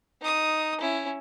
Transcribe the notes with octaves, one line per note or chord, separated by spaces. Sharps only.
D#4 D#6
C#4 E4